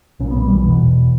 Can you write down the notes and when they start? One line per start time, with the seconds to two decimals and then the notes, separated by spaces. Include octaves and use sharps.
0.19 B1 A#2 C#4
0.31 B3
0.42 G3
0.53 E3
0.64 E1 E2 B2